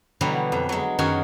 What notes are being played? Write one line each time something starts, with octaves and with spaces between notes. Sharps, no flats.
B2 D3 E3 F#3 G3 B3
F2
F#3 G#3
F#2 D#3 G#3 F#4 G#5